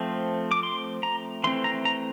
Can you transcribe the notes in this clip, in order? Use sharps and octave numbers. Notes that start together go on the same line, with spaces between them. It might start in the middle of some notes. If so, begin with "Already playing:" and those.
Already playing: F3 A3 C4
D6
C6
A#5
E3 A3 C4 C6
A#5
A#5